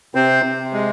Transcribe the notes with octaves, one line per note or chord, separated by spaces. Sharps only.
C3 C4 C5
C3
G#3